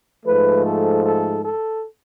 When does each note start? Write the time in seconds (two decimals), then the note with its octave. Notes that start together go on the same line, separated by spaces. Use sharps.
0.25 G#2 F3 A3 B4
0.64 A4
1.04 A4
1.43 A4